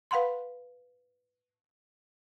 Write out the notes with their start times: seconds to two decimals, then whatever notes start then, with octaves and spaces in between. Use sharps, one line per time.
0.11 B4 F5 F#5 B5 C6